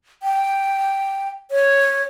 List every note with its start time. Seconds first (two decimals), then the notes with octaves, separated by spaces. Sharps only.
0.23 G5
1.51 C#5